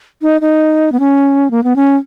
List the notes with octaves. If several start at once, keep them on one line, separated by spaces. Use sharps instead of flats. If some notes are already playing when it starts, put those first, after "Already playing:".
D#4
D#4
B3
C#4
A#3
B3
C#4